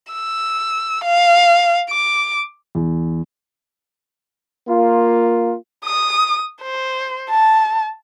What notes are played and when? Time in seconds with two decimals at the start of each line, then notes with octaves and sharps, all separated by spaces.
0.13 E6
1.04 F5
1.90 D6
2.75 E2
4.67 A#3 F4
5.85 D#6
6.62 C5
7.30 A5